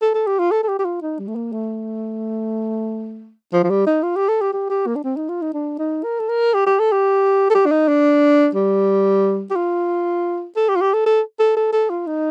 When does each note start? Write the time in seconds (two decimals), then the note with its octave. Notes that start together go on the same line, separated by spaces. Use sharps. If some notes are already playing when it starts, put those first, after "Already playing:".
0.02 A4
0.14 A4
0.27 G4
0.39 F4
0.51 A4
0.64 A4
0.69 G4
0.79 G4
0.85 F4
1.02 D#4
1.19 G3
1.27 A3
1.36 A#3
1.52 A3
3.53 F3
3.64 F3
3.70 G3
3.86 D#4
4.03 F4
4.16 G4
4.28 A4
4.41 G4
4.53 G4
4.70 G4
4.87 A#3
4.96 D4
5.04 C4
5.17 D#4
5.29 F4
5.42 D#4
5.54 D4
5.79 D#4
6.03 A#4
6.19 A4
6.29 A#4
6.54 G4
6.67 G4
6.80 A4
6.92 G4
7.51 A4
7.55 G4
7.66 D4
7.72 D#4
7.88 D4
8.55 G3
9.51 G4
9.56 F4
10.56 A4
10.69 G4
10.76 F4
10.81 G4
10.93 A4
11.06 A4
11.40 A4
11.57 A4
11.73 A4
11.90 F4
12.07 D#4